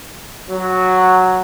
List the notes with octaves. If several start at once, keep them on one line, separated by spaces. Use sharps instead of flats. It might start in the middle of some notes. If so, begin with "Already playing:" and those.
F#3